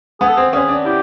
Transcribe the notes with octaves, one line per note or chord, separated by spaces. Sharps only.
B3 G#4
A4
C4 G#4
C#4 G#4
D4
E4 G4